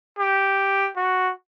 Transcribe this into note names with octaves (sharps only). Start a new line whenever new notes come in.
G4
F#4